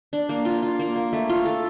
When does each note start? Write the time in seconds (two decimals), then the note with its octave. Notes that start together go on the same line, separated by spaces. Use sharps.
0.13 D4
0.29 A#3
0.45 F4
0.62 F4
0.79 A#3
0.96 A#3
1.13 A3
1.29 F4
1.45 A4